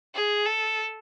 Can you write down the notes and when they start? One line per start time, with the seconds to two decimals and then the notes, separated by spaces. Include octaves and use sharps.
0.14 G#4
0.46 A4